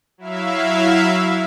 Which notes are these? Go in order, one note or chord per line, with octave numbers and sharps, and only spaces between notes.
F#3 E4 E5 F5